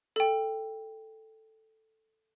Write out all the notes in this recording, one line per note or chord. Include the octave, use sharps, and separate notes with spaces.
A4 G5